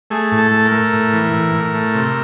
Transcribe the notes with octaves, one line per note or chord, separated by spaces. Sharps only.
A3 G#4
A2
A4
A3
A#4
A3
A2
E3
A2
A2
A3
C3